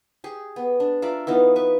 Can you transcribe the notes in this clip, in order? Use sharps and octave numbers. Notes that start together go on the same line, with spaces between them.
G4 G#4
B3
D4
F4 A#4 D5 E5
E3 B3 D#4 F4
B4 C#6